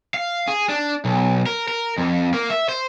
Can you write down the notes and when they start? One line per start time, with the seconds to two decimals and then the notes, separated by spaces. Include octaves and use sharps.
0.14 F5
0.48 G#4
0.69 D4
1.05 B1
1.46 A#4
1.68 A#4
1.98 F2
2.34 A#3
2.50 E5
2.69 C5